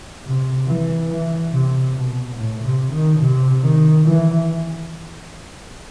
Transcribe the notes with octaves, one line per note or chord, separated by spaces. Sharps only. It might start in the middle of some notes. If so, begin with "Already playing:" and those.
C3
E3
E3
C3
B2
A2
C3
D#3
C3
D#3
E3